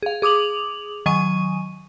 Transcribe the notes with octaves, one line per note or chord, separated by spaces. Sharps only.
G#4 F5
G#4 D6 D#6 F7 F#7
D#3 F#3 G#5 C#6 D#6 D#7